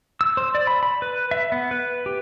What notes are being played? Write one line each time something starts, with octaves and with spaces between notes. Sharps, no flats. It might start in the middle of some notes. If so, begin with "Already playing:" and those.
E6
C5
D5
B5
B5
B4
E5
B3
B4
G4